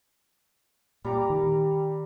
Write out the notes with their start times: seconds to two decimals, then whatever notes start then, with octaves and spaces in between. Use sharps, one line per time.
1.05 A#2 G3 G4 G5 A#5 D6
1.30 D#3